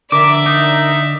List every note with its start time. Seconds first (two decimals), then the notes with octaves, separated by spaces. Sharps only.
0.12 D3 A#4 D5 E5 D6
0.46 D#4